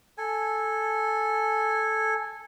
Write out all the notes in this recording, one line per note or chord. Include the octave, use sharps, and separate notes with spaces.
A4 G#5